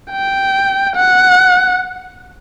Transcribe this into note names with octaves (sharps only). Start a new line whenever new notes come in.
G5
F#5